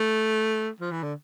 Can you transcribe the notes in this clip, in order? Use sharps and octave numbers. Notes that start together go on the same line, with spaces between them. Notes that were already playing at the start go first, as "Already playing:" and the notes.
Already playing: A3
F3
E3
D3